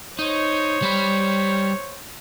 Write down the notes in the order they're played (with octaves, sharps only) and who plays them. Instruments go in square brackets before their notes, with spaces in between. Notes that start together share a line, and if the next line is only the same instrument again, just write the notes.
[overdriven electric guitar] D#4 [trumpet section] C5 C#5
[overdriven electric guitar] G3 B5